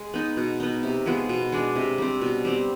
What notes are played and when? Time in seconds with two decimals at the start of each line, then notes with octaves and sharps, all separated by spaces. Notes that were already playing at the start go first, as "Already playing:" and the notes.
Already playing: G#3
0.14 B3 D#4
0.37 B2
0.60 B3 D#4
0.83 C3
1.06 F3 G#3 B3
1.29 B2
1.52 G#3 D4
1.76 C3
1.98 G3 C4
2.21 B2
2.45 G3 C4